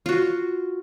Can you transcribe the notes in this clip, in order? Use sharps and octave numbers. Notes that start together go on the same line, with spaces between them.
F4 F#4